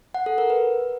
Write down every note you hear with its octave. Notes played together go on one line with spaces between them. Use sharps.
F#5
A4
A#4
B4